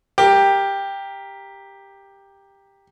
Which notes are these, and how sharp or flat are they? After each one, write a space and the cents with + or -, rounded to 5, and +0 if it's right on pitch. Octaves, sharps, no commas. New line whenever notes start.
G4 +10 A#4 +0